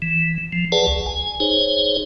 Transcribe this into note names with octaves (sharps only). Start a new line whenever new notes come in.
E3
F3
G#4 B4 D5 F#5 A5
C#2
G#5
D#4 G#4 C5 C#5